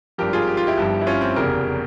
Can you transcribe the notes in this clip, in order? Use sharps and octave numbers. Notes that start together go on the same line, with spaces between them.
G#1 G2 F3 G4 A#4
F4 G#4
G4
F4
E4 G4
G1 G2 F3
E4
C#4 F4
C4
F1 E2 C#3 G4 A#4